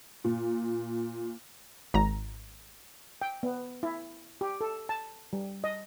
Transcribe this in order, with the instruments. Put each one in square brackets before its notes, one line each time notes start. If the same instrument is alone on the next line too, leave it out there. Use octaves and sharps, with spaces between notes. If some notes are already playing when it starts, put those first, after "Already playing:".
[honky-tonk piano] A#2
[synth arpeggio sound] G#1 A#5
[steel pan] G5
B3
E4
G4
A4
A5
G3
D#5